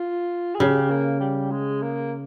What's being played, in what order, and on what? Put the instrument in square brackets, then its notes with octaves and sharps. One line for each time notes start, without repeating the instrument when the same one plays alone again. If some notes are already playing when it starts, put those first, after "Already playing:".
Already playing: [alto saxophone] F4
G#4
[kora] C#3 [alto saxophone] G4
[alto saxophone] A#3
G3
G#3
A#3